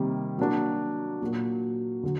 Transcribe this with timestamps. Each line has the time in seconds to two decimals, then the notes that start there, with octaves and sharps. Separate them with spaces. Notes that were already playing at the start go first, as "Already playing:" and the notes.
Already playing: C3 D#3 G3 A#3
0.38 F#3 A#3 D4 F#4
1.21 A#2 F#3 A#3 F#4
2.03 D3 F#3